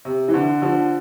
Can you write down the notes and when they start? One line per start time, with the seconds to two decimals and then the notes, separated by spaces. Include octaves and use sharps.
0.05 C3
0.28 E3
0.34 D3
0.62 D3 F3